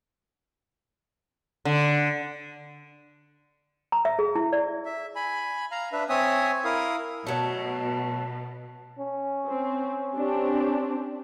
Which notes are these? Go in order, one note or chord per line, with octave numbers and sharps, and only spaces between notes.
D3
A#5
E5
G#4
E4
D5
E5
G#5 B5
F5 A#5
D4 B4 E5
C4 C#5 E5 G#5 D#6
E4 A#4 F5 D#6
B2 F#3 A3
C#4
C4
C4 D4 G4